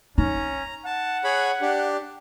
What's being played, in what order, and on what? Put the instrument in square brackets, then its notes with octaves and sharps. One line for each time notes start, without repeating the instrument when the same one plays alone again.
[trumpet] C#4 [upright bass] D#4 [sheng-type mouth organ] A#5
[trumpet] F#5 [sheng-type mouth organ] A5
[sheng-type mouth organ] G#4 C#5 B5
D4 G4